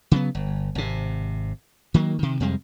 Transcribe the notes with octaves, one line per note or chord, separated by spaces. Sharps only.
C#3 F#3 A#3 B3
G1
G#1 C3
D#3 F#3 A#3
C3 D#3
F2 C3 G3 G#3